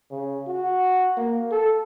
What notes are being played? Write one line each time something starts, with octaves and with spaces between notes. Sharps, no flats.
C#3
F#4
A#3
A4